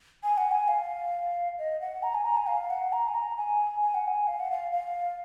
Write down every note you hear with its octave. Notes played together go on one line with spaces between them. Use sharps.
G#5
F#5
G#5
F5
D#5
F#5
A#5
G#5
A#5
G#5
F5
F#5
A#5
G#5
A#5
G#5
G#5
F#5
G#5
F5
F#5
F5
F5